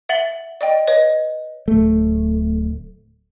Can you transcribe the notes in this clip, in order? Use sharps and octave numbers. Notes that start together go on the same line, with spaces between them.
E5 F#5 A6 F#7 G7
D5 D#5 G5
B4 C#5 D#5
D1 A3